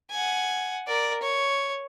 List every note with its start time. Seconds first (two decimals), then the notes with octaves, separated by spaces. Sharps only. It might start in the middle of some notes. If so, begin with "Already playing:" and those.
0.11 F#5 G#5
0.88 A#4 D5
1.22 C#5